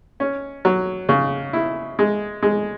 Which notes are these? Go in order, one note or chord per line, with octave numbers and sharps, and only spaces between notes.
C#4
F#3
C#3
E4
G#3
G#3